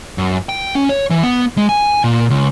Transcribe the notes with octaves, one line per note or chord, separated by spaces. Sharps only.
F#2
G5
C#4
C#5
E3
B3
G#3
G#5
A#2
C#2